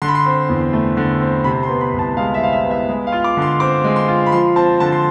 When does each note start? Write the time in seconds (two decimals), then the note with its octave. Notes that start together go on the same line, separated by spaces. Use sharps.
0.02 D3 C6
0.08 B5
0.15 C6
0.25 C4
0.49 E2
0.73 A3
0.97 D3
1.20 C4
1.44 C3 B5
1.63 C6
1.69 B3
1.81 B5
1.93 C2
1.99 A5
2.17 G#3 F5
2.34 E5
2.41 C3 F5
2.52 E5
2.65 B3
2.71 E5
2.89 G#3
3.07 F5
3.12 F4
3.24 D6
3.37 D3 C6
3.60 C4 D6
3.84 G#3
3.96 C6
4.08 F4
4.26 B5
4.32 F3 C6
4.56 C4 A5
4.80 D3 A5
4.92 C6